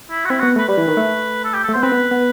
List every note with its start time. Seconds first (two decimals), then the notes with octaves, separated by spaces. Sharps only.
0.10 E4
0.25 F#4
0.29 C4 E4
0.39 B3 F#4
0.56 A3 B4
0.68 G3 B4
0.77 E3
0.88 D#3
0.97 A3
1.45 A4
1.54 G4
1.64 A3 A4
1.74 B3 C5
1.83 C4 B4
1.92 B3
2.11 B3